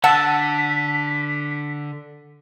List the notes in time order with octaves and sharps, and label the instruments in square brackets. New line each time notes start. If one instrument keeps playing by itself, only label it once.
[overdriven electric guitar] D3 [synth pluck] F#5 E6 [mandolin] A5 [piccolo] B6